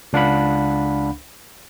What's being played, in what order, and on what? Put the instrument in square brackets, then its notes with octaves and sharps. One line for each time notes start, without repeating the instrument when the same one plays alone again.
[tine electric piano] C#2 D4 F5 F#5 B5